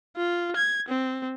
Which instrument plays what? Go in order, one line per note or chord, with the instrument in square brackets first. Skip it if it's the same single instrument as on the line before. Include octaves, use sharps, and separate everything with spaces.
[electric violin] F4
G#6
C4